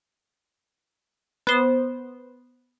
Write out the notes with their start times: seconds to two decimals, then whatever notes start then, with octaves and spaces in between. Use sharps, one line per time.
1.47 B3 C5